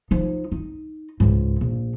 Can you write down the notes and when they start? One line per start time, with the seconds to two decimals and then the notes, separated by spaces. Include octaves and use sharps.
0.11 F3 D#4
0.52 D#4
1.20 C#2 G#2
1.61 A#1